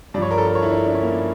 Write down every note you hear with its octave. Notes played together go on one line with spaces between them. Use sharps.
G2 F3 C#5 D5
A#4
A4
A#4
C#5
E4
D4
D4
C#4
A#3